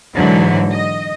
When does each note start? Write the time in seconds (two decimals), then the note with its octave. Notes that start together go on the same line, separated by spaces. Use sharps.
0.13 G#2 D3 E3 F#3
0.72 D#5